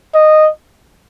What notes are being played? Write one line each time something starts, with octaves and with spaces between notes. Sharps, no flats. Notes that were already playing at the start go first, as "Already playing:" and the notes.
D#5